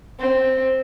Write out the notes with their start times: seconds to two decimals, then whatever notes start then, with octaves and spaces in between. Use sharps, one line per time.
0.20 C4